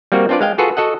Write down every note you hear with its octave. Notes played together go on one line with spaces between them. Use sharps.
G3 A#3 C4 F#4
C4 D4 F4 B4 D5
G#3 F5 G5
F4 F#4 G#4 A4 B4
F#4 A4 D#5 F#5